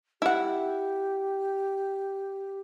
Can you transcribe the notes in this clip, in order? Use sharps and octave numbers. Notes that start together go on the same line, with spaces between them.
E4 G4 F#5